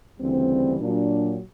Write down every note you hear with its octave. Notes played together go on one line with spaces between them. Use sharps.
D2 C#3 E3 G3 C4
A#2 F#3 D4